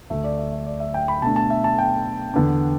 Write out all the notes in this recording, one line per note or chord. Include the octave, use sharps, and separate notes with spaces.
D2 D3 A3 E5
D5
E5
E5
D5
E5
G5
B5
B2 A3 D4 A5
A5
E5
A5
G5
E2 D3 B3 D4